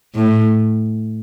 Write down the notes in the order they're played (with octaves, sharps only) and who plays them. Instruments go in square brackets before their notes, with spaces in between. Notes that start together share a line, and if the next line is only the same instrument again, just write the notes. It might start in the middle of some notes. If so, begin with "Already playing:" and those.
[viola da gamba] A2